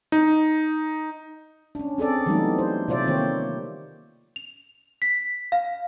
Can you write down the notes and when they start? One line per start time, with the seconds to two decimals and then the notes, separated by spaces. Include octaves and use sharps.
0.12 D#4
1.75 C#4 D4
1.98 C4 G#4 A4 D5
2.26 E3 F#3 G3 A3 B3 D#4
2.58 C5
2.88 C3 F4 C5 D5 E5
3.07 D#3 A#3 G4 C5 C#5
4.36 F7
5.02 B6
5.52 F5